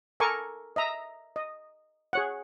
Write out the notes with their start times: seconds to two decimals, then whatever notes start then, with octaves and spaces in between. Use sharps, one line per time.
0.20 A4 A#4 G#5 C#6 D6
0.76 D#5 E5 A#5
1.36 D#5
2.13 G#4 C#5 F#5